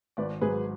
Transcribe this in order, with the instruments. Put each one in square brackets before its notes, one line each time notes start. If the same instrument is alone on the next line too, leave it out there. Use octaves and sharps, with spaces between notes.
[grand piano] G#1 [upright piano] B4 D5
[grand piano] G#2 F#3 [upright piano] G#4 B4